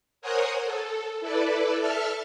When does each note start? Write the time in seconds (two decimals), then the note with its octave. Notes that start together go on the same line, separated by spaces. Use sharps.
0.22 A#4 C5 C#5 F#5 G#5 D#6
0.64 A4
1.21 E4 A4 B4 D5
1.79 A4 E5 A5 F6